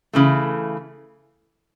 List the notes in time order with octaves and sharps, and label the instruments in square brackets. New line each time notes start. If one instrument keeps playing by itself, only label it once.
[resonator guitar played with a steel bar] C#3 E3 A3